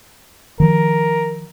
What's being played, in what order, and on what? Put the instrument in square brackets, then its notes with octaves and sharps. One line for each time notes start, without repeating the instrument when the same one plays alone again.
[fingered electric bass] D#3 F3 [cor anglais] A#4